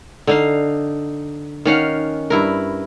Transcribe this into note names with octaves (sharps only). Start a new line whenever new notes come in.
D3 D#4 F5
D#3 C#4 F5 F#5
G2 E4 A#4